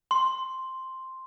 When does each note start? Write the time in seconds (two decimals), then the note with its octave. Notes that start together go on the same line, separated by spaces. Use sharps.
0.11 C6